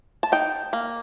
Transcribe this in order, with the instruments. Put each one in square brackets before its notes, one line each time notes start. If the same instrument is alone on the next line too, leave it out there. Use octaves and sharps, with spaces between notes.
[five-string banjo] A5
D#4 G5
A#3